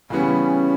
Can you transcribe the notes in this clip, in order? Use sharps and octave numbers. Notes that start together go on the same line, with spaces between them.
C#3 E3 G3 B3 C#4